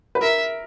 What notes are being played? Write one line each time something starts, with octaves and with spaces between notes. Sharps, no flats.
B4
A#4 E5